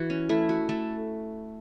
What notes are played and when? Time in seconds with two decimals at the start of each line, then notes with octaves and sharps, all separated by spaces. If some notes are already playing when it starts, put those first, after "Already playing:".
Already playing: E3 F#4
0.10 C#4
0.29 A3 E4
0.49 F#4
0.69 A3 A4